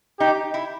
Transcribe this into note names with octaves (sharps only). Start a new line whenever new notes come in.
D#4 G4
E4